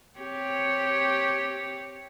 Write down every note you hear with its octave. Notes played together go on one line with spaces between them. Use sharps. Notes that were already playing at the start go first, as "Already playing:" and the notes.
C4 G4 C#5